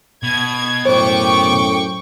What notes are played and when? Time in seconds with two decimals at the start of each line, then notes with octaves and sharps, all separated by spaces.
0.23 B2 G#6
0.85 F#2 A2 C5 G5 C#6 D6